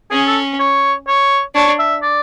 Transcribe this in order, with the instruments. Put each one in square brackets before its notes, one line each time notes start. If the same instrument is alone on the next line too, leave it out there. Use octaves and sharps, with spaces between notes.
[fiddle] C#4 [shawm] G#4
[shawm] A4
C#5
C#5
[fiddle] D4 [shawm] C#5
[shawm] E5
D5